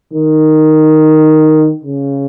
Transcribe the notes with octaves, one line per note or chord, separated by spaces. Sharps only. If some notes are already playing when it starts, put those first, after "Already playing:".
D#3
C#3